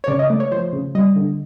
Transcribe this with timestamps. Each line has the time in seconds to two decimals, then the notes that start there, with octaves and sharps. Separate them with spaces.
0.04 C#5
0.08 C#3 D5
0.19 D#5
0.30 A3 D5
0.40 C#5
0.51 F3 C5
0.73 C#3
0.95 G3 D#5
1.16 D3